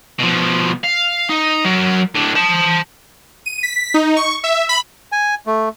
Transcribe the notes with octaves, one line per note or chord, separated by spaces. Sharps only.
B2 F3
F5
D#4
F#3 A#4
A2 D4
C5 A5
D#7
B6
D#4
C#6
E5
B5
G#5
A3